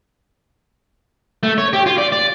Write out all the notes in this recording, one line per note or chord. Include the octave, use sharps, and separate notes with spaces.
A3
C#5
G4
F4
D5
D5